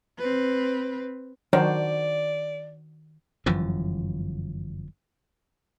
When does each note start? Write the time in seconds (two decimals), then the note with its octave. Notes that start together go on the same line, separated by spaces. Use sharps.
0.18 C4 B4
1.53 D#3 F#3 D4 F#4 C5 D5
3.46 G1 F#2 E3 F3